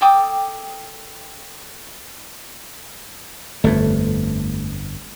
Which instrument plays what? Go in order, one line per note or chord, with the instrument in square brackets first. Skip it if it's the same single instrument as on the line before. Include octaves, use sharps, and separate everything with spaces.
[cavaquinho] A4 G5 D6 D#6
[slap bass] G1 F2 [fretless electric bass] A3